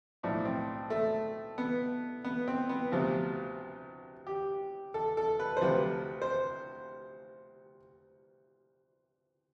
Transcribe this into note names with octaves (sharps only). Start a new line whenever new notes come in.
B1 A2 F3 D4
C4
A3
B3
B3
C4
B3
D2 C3 F3
G4
A4
A4
B4
C5
D2 C3 F3 B4
C5